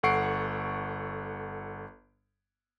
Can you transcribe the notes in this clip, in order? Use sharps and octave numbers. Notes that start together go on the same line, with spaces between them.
G1 A4 F#5 C#6 C7 D7